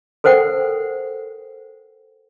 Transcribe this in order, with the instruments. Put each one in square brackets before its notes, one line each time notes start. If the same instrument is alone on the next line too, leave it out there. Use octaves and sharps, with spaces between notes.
[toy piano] A4 A#4 C5 F#5 G5